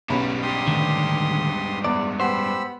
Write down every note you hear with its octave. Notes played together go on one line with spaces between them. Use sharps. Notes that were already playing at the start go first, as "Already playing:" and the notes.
B1 G#2 G3 C#4 B5
G4 C6 D#6
A2 D3 D#3
E2 D5
B3 G4 C5 B5 E6